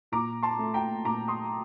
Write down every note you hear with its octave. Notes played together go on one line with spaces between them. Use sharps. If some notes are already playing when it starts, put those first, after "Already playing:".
A#2 A#5 D6
A5 C6
A3
G5 A#5
A#2 A#5 D6
C6 D#6